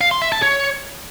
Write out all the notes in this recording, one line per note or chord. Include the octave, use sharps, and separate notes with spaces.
F5
C6
E5
A5
C#5